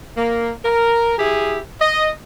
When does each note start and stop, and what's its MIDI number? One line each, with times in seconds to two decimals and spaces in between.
0.16 0.51 58
0.65 1.15 70
1.18 1.58 64
1.18 1.58 67
1.18 1.58 68
1.81 2.09 75